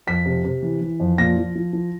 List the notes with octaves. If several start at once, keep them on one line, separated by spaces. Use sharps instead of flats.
F2 B6
C3
C3
E3
E3
F2
A#2 A#6
F3
F3
F3